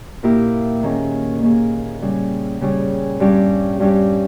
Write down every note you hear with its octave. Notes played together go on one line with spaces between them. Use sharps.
A#2 A#3 E4 G4
D#3 A#3 C#4 G#4
D#3 A#3 C#4 G#4
C#3 G3 C#4 G#4
C#3 G3 C#4 G#4
G2 G3 C#4 G4
G2 G3 C#4 G4